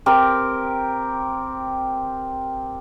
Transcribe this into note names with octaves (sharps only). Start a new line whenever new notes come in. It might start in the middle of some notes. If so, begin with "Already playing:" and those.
C4 G4 A#4